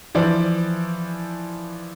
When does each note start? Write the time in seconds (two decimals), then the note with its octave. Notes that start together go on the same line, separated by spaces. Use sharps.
0.15 E3 F3 C5 D5